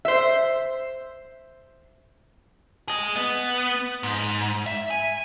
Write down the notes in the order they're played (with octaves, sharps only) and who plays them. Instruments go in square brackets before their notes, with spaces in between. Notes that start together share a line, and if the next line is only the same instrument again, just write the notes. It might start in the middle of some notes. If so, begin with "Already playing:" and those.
[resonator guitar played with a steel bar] C5 E5
[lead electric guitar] G#4 D#5
B3
G#2
E5
G#5